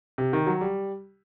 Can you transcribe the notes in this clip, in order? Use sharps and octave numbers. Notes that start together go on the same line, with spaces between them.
C3
D#3
F#3
G3